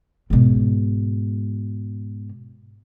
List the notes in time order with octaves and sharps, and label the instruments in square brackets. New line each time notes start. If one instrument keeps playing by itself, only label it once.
[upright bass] G#2 B2